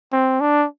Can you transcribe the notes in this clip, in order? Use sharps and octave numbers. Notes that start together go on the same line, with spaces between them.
C4
D4